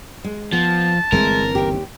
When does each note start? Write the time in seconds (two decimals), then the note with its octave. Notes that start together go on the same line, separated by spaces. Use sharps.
0.24 G#3
0.53 F3 B3 A5
1.12 G1 E3 G#3 A3 C4 A#4
1.55 D#2 G4